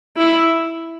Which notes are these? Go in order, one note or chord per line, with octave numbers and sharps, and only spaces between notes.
E4